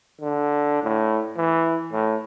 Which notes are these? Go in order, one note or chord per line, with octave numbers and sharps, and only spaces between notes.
D3
A2
E3
A2